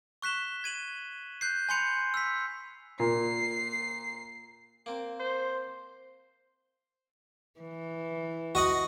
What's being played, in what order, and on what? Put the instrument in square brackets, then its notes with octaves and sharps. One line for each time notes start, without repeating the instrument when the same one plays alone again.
[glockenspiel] C#6 F#6 B6 E7 G7
G#6 D#7 F#7
F#6 G6 C7
G#5 B5 C6 G6 C#7 F7
E6 B6
[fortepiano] A#2 [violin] C7
[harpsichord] A#3 C4
[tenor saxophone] C5
[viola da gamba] E3
[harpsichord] F#4 D#5 F#5